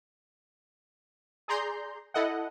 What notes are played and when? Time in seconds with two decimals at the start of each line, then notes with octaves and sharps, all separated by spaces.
1.48 G#4 D5 A#5 C6 G6
2.14 E4 A4 D#5 F#5